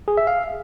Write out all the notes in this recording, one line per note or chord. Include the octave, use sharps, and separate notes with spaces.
G#4
E5
F5